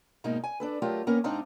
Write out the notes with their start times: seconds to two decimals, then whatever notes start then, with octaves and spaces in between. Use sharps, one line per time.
0.24 G#2 B2 A#3 D#4
0.44 G#5
0.60 D4 A4 B4
0.82 F#3 A3 F4 G4 A#4
1.07 A#3 B3 C#4 A#4
1.24 G#2 C4 D4 D#4 F5 A#5